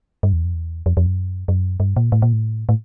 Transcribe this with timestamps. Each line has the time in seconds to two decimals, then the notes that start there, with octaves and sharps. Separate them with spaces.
0.23 G2
0.33 E2
0.45 F2
0.54 E2
0.86 F2
0.97 F2
1.06 F#2
1.48 F#2
1.80 G2
1.96 A#2
2.12 A2
2.22 A#2
2.33 A2
2.69 A2